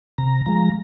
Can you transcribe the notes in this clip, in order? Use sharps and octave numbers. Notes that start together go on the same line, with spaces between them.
C3 A#5
F3 G#3 A#5